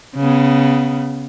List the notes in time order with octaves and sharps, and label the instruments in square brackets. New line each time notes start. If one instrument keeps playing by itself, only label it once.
[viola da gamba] C#3 B3